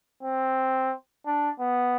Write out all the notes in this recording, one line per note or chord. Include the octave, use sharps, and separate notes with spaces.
C4
D4
B3